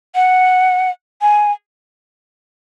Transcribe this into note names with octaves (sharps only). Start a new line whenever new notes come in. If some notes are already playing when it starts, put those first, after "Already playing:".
F#5
G#5